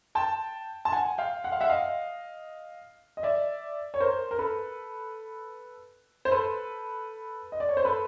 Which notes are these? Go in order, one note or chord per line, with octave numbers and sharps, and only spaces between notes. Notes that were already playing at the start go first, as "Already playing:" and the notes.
G5 A5
A5
F#5 G#5
F5 G5
F#5
F5
E5 F#5
D#5 F5
D#5
D5 E5
C#5
A#4 C5
A#4
A4 B4
C5
A4 B4
D#5
D5
C#5
C5
A4 B4